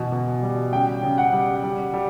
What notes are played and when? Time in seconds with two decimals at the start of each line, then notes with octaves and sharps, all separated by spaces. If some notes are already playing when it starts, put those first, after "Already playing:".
Already playing: B2 E3
0.12 B2
0.42 G3
0.72 C#3 G5
1.03 C#3
1.18 F#5
1.33 G3
1.63 G3
1.93 G3